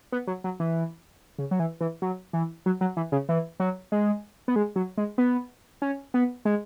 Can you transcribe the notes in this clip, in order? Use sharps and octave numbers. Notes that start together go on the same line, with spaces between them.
B3
F#3
F#3
E3
C#3
F#3
E3
E3
F#3
E3
F#3
F#3
E3
C#3
E3
F#3
G#3
B3
G#3
F#3
G#3
B3
C#4
B3
G#3